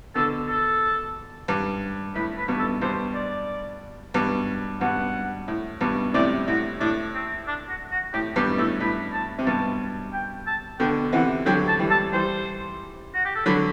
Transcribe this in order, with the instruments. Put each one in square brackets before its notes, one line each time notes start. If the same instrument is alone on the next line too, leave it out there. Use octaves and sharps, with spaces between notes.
[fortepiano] B2 D3 [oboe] A4
[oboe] A4
[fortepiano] G2
[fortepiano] A2 [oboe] B4
[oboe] B4
[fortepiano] G2 B2
[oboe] A4
[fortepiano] G2 B2 [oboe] C5
[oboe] D5
[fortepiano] G2 B2
[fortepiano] G2 B2 [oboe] F#5
[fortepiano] A2
G2 B2
[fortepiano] A2 C3 [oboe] D5
[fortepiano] A2 [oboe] F#4
[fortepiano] A2 [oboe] D4
[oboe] C4
D4
F#4
F#4
[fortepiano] A2 [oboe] G4
[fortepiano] G2 B2 [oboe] G4
[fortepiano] A2 [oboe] A4
[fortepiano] A2 [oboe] B4
[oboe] A5
[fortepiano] C3
[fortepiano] G2 B2 [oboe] A5
[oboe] G5
A5
[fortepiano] B2 D3 [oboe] G5
[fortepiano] C3 E3 [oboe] F#5
[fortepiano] D3 F#3 [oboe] G5
[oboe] A5
[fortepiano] E3 G3
[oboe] A5
[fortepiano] E3 G3 [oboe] C5
[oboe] F#4
G4
A4
[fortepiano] D3 F#3 [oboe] B4